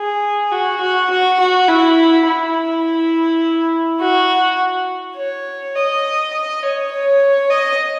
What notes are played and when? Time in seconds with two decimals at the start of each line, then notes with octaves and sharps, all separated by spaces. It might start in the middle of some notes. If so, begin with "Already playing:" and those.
Already playing: G#4
0.52 F#4
0.81 F#4
1.10 F#4
1.40 F#4
1.68 E4
2.27 E4
4.00 F#4
5.17 C#5
5.76 D#5
6.33 D#5
6.63 C#5
6.92 C#5
7.50 D#5